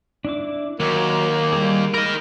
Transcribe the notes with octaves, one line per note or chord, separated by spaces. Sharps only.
D4 E4 D6
D#2 F#3 A#3
G3 G#4
G#3 A#4 D#5 B5 F6